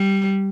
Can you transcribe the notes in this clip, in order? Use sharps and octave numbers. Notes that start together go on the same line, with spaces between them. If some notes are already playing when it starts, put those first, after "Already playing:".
Already playing: G3